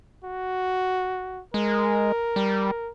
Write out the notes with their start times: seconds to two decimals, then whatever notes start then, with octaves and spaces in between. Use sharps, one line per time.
0.24 F#4
1.54 G#3 A#4
2.36 G3